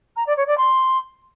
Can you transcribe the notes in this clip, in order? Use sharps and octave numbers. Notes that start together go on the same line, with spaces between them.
A#5
D5
C#5
D5
C6